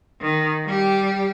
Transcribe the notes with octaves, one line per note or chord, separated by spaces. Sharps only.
D#3
G3 G4